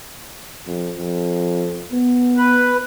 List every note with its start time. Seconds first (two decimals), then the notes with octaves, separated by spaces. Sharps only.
0.67 F2
0.97 F2
1.92 B3
2.37 B4